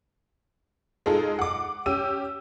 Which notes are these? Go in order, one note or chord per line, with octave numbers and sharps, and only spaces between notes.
G#3 D#4 F4 G#4 A4
F#5 D6
C#4 G4 E6 D#7